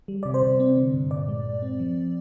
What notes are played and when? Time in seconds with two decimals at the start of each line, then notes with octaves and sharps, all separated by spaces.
0.08 G3
0.23 C3 D5
0.34 C5
0.43 C3
0.60 C4
0.77 D3
0.94 G2
1.11 A#2 D5
1.28 G#3
1.46 A#2
1.62 C4
1.79 F3